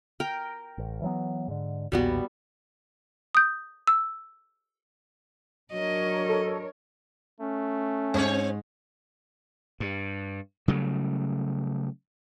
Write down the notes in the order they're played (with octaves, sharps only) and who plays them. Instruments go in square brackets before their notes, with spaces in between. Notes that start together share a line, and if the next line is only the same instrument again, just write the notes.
[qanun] A#4 G5
[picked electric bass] A1
E3 F#3 B3
G#2 D3
[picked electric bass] B1 E2 A#2 [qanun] G3 B3 F#4
[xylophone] D#6 G6
E6
[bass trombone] F#3 [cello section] D4 A#4 C#5 [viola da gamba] D#5
[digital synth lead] A4
[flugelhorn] A3 [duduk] C#4
[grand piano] G#2 [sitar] C4 C#5
[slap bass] G2
C#3 F#3 G3 A3